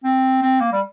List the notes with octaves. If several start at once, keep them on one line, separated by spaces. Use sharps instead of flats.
C4
C4
A#3
G3